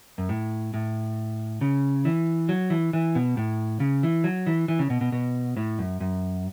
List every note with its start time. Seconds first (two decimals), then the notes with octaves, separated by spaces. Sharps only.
0.18 F#2
0.29 A2
0.74 A2
1.61 C#3
2.05 E3
2.49 F#3
2.70 E3
2.93 E3
3.15 B2
3.37 A2
3.80 C#3
4.03 E3
4.24 F#3
4.47 E3
4.68 E3
4.79 C#3
4.90 B2
5.01 B2
5.12 B2
5.57 A2
5.79 F#2
6.00 F#2